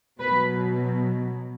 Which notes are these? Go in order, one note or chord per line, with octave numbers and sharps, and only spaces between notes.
B2 F#3 B4